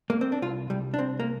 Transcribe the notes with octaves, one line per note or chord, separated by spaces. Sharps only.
A#3
C4
D4
C2 F4
C2 G3
D4
C2 C4
A#3